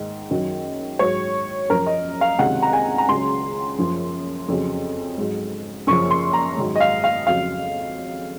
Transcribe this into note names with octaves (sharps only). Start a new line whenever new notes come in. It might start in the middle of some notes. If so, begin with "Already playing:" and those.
Already playing: G#2 D#3
F#2 D#3 F#3
G#2 F#3 C#5
F#2 F3 A#4
D#5
F5
C#2 C3 D#3 F#3 F#5
A#5
G#5
A#5
C#2 C#3 F#3 C6
F#2 F3
F2 C#3 F#3
G#2 F#3
F#2 C#3 F3 C#6
C6
A#5
G#2 D#3 F#3
D#5
F5
F5
F2 C#3 F#3 F5